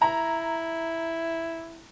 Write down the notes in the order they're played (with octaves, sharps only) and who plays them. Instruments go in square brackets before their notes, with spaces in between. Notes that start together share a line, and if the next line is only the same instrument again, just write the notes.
[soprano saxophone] E4 [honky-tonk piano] A#5